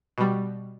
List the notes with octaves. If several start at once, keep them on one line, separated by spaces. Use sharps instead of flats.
B2 G3